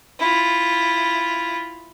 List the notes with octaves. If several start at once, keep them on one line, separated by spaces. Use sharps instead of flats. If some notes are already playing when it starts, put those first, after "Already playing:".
E4 F4